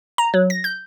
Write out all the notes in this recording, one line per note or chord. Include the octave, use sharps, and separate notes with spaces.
A#5
F#3
A#6
G6